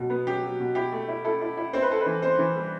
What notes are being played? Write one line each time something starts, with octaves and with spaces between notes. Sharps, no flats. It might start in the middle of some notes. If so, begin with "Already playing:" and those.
Already playing: B2 F#3
B3
F#3 G4
F#3
B2
E4 G4
A3
E4
E4 A4
E4
E4
C4 C5
B4
E4 A4
B4
E3
C4 C5
E3
G3